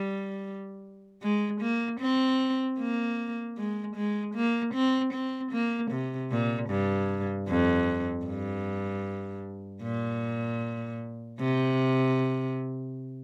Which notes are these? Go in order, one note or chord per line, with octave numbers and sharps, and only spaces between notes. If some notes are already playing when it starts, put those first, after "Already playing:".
Already playing: G3
G#3
A#3
C4
A#3
G#3
G#3
A#3
C4
C4
A#3
C3
A#2
G2
F2
G2
A#2
C3